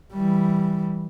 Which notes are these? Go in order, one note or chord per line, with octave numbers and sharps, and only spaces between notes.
E3 G3